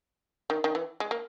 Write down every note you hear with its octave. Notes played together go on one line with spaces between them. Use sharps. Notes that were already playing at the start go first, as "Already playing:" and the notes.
D#3
D#3
E3
G#3
A#3